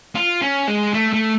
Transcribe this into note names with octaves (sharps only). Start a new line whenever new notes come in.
F4
C#4
G#3
A3
A3